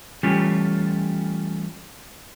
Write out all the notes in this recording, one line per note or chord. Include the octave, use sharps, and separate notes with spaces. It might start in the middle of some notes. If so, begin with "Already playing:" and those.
E3 G3 A3 C#4 F4 G4